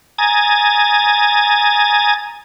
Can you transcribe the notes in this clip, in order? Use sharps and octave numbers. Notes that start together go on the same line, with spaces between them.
G#5 A#5 D#6 G#6 A6